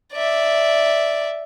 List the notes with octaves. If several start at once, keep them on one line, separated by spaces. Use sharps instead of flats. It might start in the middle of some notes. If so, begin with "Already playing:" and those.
D5 E5